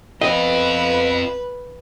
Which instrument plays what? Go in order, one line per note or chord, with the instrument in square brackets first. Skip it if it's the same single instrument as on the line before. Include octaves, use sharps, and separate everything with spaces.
[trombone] B3 [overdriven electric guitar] C4 F4 [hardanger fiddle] B4 [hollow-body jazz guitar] D#5